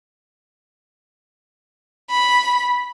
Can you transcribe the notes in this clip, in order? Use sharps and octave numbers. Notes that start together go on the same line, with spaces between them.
B5